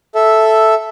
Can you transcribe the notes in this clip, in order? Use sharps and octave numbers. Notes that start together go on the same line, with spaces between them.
A4 E5